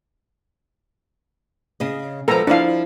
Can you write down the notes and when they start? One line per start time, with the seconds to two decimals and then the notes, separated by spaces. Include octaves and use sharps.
1.80 C#3 G#4 D#5
2.28 F3 G#3 B3 A4 A#4 A#5
2.47 F3 D4 E4 F5